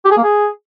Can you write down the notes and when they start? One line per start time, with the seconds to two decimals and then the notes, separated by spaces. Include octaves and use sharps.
0.05 G4
0.11 G#4
0.17 A#3
0.24 G#4